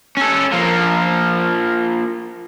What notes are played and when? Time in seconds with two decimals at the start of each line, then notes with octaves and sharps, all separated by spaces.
0.17 C#4 A4
0.52 F3 A#3